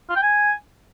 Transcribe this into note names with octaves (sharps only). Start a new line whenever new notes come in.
F4
G5
G#5